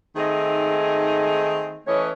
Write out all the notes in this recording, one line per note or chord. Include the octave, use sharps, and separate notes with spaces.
D#3 A3 C4 D#4 G#4
E3 A3 C#4 B4 C#5 D#5